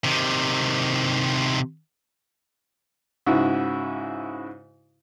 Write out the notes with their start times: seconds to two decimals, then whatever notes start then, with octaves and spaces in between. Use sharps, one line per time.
0.04 C3 D#3
3.26 G#2 C#3 E4 F#4